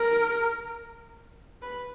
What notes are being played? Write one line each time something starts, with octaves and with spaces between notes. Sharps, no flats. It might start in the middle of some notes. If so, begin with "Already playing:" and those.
Already playing: A#4
B4